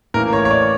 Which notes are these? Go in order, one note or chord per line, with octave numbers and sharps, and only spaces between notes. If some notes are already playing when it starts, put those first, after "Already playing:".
A2 E3 A#3 C#4 A#4
C#5
C#5
D5